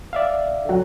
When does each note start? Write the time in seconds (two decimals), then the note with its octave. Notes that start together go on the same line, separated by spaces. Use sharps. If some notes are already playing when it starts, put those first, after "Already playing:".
0.13 D5 E5 F5
0.65 D3 F#3